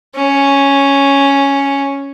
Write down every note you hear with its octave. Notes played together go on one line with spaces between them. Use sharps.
C#4